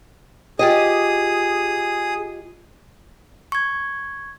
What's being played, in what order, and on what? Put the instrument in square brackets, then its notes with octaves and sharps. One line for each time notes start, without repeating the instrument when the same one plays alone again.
[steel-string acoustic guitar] F4 G4 D#5 [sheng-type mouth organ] G#4 D#6
[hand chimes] C#6 G#6